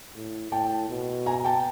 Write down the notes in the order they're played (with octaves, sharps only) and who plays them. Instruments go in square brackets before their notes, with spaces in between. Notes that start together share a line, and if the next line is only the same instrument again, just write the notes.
[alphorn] A2
[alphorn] A2 [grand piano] G5 A5
[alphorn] B2
[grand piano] G#5 A#5
G5 A5